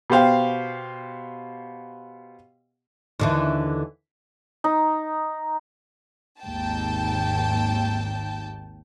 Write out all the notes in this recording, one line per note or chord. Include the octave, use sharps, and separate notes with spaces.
B2 G4 C5 F5 G5
D#2 D3 E3
D#4
G#1 D#2 G5 A5